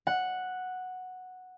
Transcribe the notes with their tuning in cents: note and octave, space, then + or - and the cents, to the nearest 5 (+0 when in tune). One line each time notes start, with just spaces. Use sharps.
F#5 -5